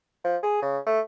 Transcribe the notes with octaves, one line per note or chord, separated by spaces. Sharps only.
F3
G#4
C#3
A3